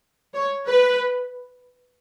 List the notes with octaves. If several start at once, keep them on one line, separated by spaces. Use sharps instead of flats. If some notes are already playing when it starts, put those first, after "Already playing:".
C#5
B4